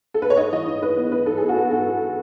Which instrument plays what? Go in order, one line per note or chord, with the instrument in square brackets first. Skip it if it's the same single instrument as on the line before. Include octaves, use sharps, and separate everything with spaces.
[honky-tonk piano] A4
B4
C#5
G#2 D#5
E3 D#5
G#2
G#2 B4
B3
G#2 B4
G#2 A4
G#4
B3
F#4
B3 G#4
G#2 A4
G#2